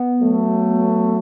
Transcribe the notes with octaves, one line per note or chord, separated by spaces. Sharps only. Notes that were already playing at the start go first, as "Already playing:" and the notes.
Already playing: B3
F#3 A3